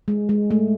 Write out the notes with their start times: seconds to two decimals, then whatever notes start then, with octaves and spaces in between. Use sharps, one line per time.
0.08 G#3
0.29 G#3
0.50 A3